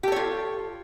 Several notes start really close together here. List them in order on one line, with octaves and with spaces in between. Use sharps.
G4 A4 C#5 F4